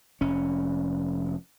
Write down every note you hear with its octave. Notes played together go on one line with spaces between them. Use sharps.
F1 C#4